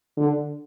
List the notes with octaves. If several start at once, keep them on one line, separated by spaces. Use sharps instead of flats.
D3